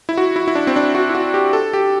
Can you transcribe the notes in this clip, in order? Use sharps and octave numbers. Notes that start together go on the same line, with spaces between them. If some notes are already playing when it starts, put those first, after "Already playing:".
E4
F#4
E4
E4
D4
C4
D4
F#4
E4
F#4
G4
A4
G4